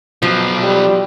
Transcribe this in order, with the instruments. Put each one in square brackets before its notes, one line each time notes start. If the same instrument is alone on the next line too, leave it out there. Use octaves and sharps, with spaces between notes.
[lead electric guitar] B2 F#3 [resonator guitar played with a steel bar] F3
[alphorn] G3